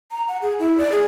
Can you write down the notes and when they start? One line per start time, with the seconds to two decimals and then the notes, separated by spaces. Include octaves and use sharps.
0.11 A#5
0.28 F#5
0.42 G#4
0.59 E4
0.78 D5
0.92 G#4